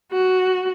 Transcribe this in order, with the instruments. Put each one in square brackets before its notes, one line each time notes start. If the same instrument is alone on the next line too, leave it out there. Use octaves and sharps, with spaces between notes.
[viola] F#4